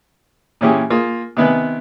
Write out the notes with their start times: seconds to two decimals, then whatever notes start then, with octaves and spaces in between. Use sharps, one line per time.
0.61 A#2 E3 C#4 E4 G4 G#4
0.90 A#3 F4 G#4
1.37 C3 D#3 B3 B4 G#5 F#6